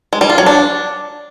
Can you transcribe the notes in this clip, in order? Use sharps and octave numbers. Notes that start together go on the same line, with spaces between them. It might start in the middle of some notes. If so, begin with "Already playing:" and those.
G#3
G3
F4
F#3
D4